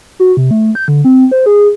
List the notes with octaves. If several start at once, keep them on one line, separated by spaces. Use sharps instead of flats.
F#4
C3
A3
G6
D3
C4
C5
G#4